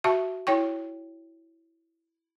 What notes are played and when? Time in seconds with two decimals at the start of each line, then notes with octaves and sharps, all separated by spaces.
0.04 F#4 E5 A5 C#6
0.47 E4 C#5 G5 C#6